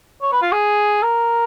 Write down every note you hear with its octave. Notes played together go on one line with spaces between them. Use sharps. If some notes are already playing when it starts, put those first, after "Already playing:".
C#5
B4
F4
G#4
A#4